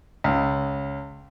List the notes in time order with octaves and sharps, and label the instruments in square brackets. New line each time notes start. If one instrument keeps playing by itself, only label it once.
[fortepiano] C#2